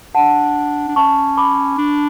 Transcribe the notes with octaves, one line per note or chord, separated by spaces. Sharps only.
D4 F#5 A5
D4
C#4 A5 C#6
B5 D6
D4